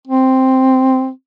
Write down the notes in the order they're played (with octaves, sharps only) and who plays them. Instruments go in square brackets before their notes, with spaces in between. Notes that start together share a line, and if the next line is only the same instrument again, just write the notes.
[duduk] C4